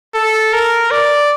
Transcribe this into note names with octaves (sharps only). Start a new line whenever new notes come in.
A4
A#4
D5